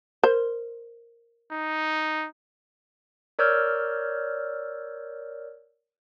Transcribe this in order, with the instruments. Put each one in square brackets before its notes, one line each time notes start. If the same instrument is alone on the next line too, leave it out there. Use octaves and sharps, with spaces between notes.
[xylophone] A#4 [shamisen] C5
[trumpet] D#4
[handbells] A#4 C#5 D5 E6 F6 G6